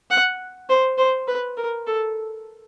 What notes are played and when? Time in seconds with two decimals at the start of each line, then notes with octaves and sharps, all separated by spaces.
0.10 F#5
0.69 C5
0.98 C5
1.27 B4
1.57 A#4
1.87 A4